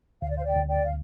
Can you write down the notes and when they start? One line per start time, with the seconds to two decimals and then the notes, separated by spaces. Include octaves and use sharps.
0.22 D2 F5
0.29 D5
0.36 C5 F5
0.44 D5 G5
0.56 D2
0.68 D5 G5
0.86 F5